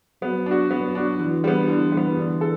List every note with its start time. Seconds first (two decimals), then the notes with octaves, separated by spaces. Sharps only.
0.22 F#3 B3
0.46 D4 F#4
0.70 F#3 B3
0.95 D4 F#4
1.19 D3 E3
1.44 G3 B3
1.68 D3 E3
1.92 G3
1.97 B3
2.17 D3
2.41 A4